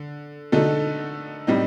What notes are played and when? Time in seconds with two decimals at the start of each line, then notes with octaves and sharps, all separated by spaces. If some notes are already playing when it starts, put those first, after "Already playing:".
Already playing: D3
0.52 D3 A3 D#4 F#4 A4
1.47 A2 G3 C4 D#4